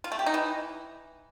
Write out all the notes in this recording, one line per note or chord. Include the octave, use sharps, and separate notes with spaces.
F4
A3
G4
D#4
E3